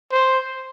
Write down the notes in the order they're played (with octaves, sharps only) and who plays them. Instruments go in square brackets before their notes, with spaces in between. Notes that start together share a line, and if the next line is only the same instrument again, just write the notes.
[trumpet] C5